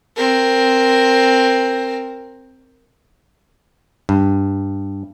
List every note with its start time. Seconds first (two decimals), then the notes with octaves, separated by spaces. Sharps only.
0.17 C4 A#4
4.09 G2